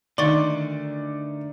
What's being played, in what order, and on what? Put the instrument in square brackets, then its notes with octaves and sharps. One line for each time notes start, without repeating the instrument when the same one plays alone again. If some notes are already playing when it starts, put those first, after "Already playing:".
[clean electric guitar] D3 A3 [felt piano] D#3 [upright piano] D5 [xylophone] C6 C#6 A6